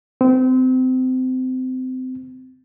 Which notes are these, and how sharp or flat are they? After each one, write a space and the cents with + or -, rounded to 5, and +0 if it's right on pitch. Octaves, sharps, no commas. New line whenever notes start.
C4 -30